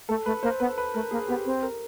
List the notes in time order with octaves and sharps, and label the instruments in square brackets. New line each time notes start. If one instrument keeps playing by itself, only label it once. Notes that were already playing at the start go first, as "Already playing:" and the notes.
[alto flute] A3 [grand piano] A4
[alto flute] A3 [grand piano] B4
[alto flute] A#3 [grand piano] C5
[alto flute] B3 [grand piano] B4
[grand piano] B4
[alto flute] A3 [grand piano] A#4
[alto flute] A#3 [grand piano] G#4
[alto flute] B3 [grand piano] G4
[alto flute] C4
[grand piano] A#4